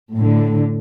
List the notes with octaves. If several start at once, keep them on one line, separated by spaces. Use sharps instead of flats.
A2 D3